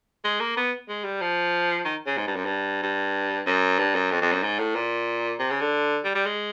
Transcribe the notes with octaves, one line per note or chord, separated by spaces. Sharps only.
G#3
A#3
B3
G#3
G3
F3
D#3
C#3
G#2
G2
F#2
G2
G2
F#2
G2
F#2
F2
F2
F#2
G#2
A2
A#2
C3
C#3
D3
G3
G3
G#3